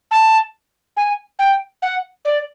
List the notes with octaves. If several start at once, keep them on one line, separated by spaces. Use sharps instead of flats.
A5
G#5
G5
F#5
D5